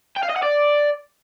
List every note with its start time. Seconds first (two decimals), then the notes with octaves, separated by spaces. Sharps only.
0.16 G5
0.23 F5
0.29 D#5
0.36 F#5
0.42 D5